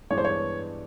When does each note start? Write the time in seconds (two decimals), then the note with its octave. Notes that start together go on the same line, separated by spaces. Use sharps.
0.10 G2 E3 G#3 B3 D4 C#5
0.18 C5
0.25 C#5